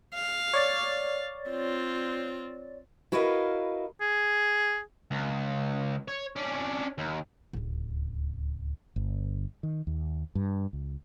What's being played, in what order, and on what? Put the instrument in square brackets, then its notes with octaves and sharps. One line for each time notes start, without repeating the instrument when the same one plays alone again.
[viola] F5
[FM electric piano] C#5 D5 A6
[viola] C4 F4
[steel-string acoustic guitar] E4 F#4 A#4 B4 D#5 F5
[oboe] G#4
[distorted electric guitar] C#2
C#5
C#4 D4
D#2
[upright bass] D1 C#2
[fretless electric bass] G1
D#3
D#2
G2
C#2